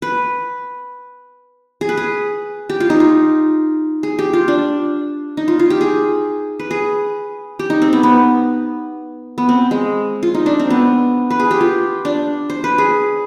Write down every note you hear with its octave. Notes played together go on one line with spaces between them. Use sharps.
B4
G#4
B4
G#4
G4
F4
D#4
F4
G#4
G4
F4
D4
D#4
F4
F4
G4
G#4
B4
G#4
G4
D#4
C4
B3
B3
B3
C4
G#3
F4
D#4
D4
C4
B3
B4
G#4
G4
F4
D4
C5
B4
G#4